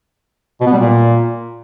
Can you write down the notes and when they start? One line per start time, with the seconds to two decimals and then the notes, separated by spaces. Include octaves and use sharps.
0.61 B2
0.67 B3
0.73 G3
0.79 A#2